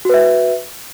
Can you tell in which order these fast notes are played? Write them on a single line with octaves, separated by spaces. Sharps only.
F#4 B4 E5